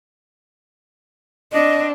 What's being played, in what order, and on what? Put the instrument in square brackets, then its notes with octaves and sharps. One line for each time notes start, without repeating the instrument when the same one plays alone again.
[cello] C4 D4 [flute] D#5